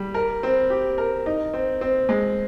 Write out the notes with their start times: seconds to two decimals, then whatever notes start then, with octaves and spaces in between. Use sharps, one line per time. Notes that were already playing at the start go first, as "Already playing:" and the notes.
Already playing: G3
0.14 A#4
0.43 C4
0.70 G4
0.98 A#4
1.26 D#4
1.54 C4
1.81 C4
2.09 G#3